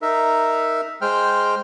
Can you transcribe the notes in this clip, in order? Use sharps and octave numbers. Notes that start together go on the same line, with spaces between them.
D#4 A#4 E5
G#3 C5 G5 F6